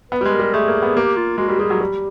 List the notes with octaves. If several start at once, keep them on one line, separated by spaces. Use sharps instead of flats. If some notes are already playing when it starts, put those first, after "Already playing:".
B3 B4
G3
G#3
A#4
G3
A3 G#4
A#3
B3
A#3 G4
F4
G#3 F#4
G3
G3 G#4
F#3
G3